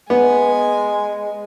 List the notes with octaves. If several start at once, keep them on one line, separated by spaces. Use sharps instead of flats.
G#3 B3 G#5